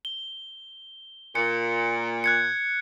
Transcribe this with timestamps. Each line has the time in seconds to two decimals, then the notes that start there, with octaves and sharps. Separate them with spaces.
0.05 G7
1.35 A#2 C#7
2.24 F#6 G#6 C#7